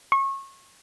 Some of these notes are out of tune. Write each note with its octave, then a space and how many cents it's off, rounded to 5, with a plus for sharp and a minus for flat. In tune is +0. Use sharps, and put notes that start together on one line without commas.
C#6 -30